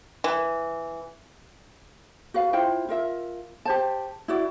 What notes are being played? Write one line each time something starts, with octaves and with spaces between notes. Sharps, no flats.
E3
F#4 B4 F5
E4 F4 C5 G5
F4 A#4 E5
G4 C5 A5
E4 F#4 D5